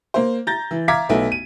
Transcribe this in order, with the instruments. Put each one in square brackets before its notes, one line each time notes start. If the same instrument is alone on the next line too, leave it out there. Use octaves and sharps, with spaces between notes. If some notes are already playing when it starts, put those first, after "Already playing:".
[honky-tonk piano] A#3 C5
A#5 G6 A6 A#6
E3
E5 F5 A#5 D6 G#6 B6
B1 A3 B3
D#7